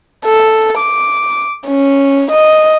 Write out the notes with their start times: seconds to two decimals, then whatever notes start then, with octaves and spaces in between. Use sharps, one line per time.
0.25 A4
0.78 D6
1.67 C#4
2.31 D#5